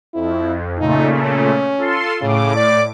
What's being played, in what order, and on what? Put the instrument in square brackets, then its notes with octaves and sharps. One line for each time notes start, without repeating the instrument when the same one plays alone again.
[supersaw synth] F2 [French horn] E4
[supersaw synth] A#2 C#3 A3 [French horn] D#4
[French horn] C#4
[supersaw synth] F4 A4 C6
[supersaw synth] A2 D6 [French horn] C#3
[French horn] D5